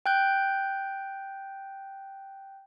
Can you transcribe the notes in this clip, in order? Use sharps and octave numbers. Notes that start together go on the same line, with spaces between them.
G5 F#6 G6